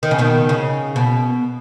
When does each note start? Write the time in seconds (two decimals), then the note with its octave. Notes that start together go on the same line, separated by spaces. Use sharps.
0.03 D#3
0.11 C#3
0.18 B2 D#3
0.49 C#3
0.96 B2